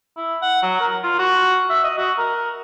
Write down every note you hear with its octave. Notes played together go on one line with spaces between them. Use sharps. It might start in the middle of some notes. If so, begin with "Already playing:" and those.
E4
F#5
F#3
A#4
F4
F#4
E5
D#5
F#4
A#4